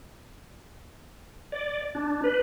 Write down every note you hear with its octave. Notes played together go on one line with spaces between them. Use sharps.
D5
D4
B4